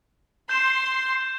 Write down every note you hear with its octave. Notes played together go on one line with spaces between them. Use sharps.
C6 G6 E7